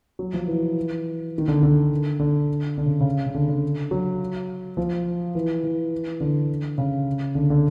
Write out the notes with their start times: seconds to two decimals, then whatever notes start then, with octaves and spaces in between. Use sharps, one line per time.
0.19 F#3
0.33 F3
0.47 E3
1.38 D#3
1.48 D3
1.63 D3
2.19 D3
2.78 D3
2.85 C#3
3.00 C#3
3.26 C#3
3.35 D3
3.48 D3
3.91 F#3
4.77 F3
5.35 E3
5.64 E3
6.20 D3
6.78 C#3
7.35 D3
7.50 D3